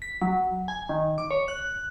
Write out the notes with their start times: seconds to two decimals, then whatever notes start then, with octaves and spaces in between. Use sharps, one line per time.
0.02 B6
0.22 F#3
0.68 G#5
0.89 D#3
1.18 D6
1.31 C#5
1.48 F#6